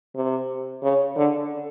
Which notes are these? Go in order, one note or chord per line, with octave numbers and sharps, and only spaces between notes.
C3
C#3
D3